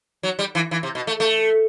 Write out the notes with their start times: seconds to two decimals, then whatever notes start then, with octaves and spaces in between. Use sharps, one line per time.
0.23 F#3
0.39 G3
0.55 E3
0.71 E3
0.83 C3
0.95 B2
1.07 A3
1.20 A3